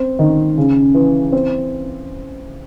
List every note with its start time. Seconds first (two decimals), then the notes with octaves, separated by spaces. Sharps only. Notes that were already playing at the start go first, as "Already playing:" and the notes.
Already playing: C4
0.19 D#3
0.58 C#3
0.94 E3
1.32 C4